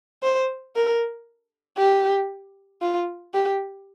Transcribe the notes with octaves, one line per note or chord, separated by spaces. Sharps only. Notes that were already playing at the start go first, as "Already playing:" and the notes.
C5
A#4
G4
F4
G4